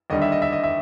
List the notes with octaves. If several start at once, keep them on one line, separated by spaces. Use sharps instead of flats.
D#2 D3 G3 D#5
E5
D#5
E5
D#5
E5